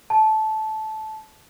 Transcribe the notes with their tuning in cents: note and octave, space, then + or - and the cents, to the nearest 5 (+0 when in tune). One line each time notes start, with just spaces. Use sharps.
A5 -15